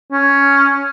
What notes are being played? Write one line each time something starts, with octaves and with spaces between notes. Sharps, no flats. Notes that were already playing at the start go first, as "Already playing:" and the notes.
C#4